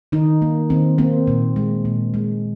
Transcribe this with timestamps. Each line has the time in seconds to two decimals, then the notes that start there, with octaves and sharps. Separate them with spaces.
0.12 D#3 D#4
0.42 A#3
0.70 D#3 C4
0.98 A#3 C4
1.27 A#2
1.56 G#3
1.85 A#2
2.14 G#3